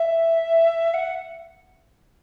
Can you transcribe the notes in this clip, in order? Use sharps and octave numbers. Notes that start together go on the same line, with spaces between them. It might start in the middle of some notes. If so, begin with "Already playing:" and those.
Already playing: E5
F#5